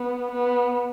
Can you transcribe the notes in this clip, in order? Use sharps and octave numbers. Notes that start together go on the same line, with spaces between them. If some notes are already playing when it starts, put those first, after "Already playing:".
Already playing: B3
B3